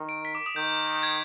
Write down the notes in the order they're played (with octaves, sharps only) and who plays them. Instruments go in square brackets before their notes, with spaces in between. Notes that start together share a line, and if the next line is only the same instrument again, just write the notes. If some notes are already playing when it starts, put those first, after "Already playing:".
Already playing: [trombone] D#3
[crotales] D7
B6
D6
D#6
[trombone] D#3 [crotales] G6
[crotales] G6
G#6